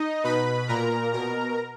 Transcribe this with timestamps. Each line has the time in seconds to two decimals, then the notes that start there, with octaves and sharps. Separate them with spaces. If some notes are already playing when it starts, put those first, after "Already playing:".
Already playing: D#4 D#5
0.24 B2 B4 B5
0.68 A#2 A#4 A#5
1.13 B2 A#4 A#5